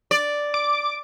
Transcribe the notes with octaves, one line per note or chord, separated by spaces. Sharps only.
D5
D6